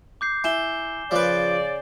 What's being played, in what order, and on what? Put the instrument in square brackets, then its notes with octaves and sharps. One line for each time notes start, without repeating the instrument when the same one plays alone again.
[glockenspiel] D6 G6 C7
[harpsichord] E4 [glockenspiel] G#5 E7 G7
[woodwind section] C#3 D5 [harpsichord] F3 B4